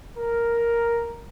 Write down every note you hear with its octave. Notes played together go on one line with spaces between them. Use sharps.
A#4